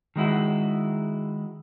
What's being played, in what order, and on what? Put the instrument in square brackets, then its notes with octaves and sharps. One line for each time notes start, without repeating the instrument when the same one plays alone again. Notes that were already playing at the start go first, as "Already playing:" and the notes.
[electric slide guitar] D#3 G#3 E4 F#4